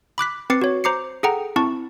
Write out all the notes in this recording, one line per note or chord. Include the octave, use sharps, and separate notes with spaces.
B5 D6 F#6 B6
C4 B4 D6 A6 C7 C#7
F#4 C#5
C5 A#5 D6 C7 C#7
G#4 A4 F#5 G5 A#5
C4 E4 A5 C#6